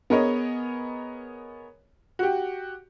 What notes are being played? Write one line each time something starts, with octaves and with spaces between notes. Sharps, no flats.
B3 G#4 A#4 C#5 D#5
F#4 G4